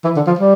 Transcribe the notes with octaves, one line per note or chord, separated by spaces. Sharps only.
E3
D3
F3
G3